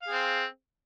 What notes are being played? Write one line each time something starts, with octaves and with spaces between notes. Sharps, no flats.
C4 G#4 F5